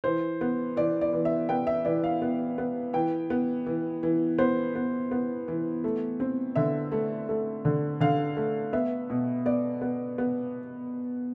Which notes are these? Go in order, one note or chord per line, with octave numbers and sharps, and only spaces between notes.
E3 C5
B3
E3 D5
D5
E3
E5
B3 G5
E5
E3 D5
F5
B3
B3
E3 G5
B3
E3
E3
B3 C5
B3
B3
E3
A3
C4
D3 E5
A3
A3
D3
D3 F5
A3
B3 E5
B2
B3 D5
B3
B3